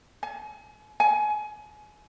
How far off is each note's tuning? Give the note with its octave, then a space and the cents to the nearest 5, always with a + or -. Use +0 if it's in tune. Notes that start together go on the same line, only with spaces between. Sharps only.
G#5 +40
G#5 +25